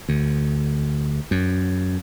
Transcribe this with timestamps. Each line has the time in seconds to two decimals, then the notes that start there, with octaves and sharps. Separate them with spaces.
0.09 D2
1.31 F#2